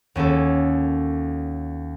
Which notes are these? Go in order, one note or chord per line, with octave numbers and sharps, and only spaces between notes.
D#2 C#4 F#4 A4